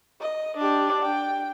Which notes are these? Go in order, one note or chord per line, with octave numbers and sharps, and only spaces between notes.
D#5
D4 G4
G5